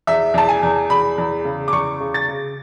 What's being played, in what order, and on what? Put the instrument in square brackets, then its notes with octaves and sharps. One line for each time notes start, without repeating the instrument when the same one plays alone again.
[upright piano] E2 E5
E2 A5
G#5
E2
E2 B5
E2
C#3
D6
E2 C#6
C#3
A6
C#3